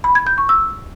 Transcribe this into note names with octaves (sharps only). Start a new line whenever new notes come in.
B5
G#6
G6
C#6
E6